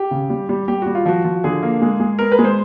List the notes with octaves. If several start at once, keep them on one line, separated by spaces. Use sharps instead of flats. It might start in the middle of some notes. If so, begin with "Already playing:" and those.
Already playing: G4
C#3
G3
G3
G3 G4
G3 F#4
F4
F3 F#4
F3
D3 G#4
A#3
G#3
G#3
B3 A#4
B4
G#3
C5